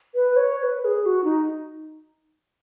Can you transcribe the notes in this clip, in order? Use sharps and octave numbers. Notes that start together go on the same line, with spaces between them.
B4
C#5
C#5
B4
B4
G#4
G#4
F#4
D#4